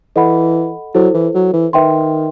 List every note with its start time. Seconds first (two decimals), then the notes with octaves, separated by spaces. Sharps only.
0.16 E3 A4 D#5 F#5 B5
0.95 F#3 E4 A4 C5
1.14 E3
1.35 F#3
1.53 E3
1.73 D#3 B4 E5 G5 C6